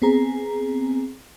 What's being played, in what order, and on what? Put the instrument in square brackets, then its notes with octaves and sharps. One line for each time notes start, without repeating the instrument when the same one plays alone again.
[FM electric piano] B3 C4 G#4 A#5